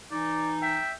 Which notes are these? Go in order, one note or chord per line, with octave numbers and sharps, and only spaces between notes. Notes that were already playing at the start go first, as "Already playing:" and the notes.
E3 D#4 D5
E5 G5